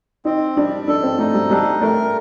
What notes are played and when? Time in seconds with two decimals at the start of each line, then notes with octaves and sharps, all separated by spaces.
0.25 C4 D#4
0.56 G3 D4
0.88 D4 A4
1.03 C4
1.18 A3 D#4
1.34 G3
1.50 G3 D4
1.82 A3 A#4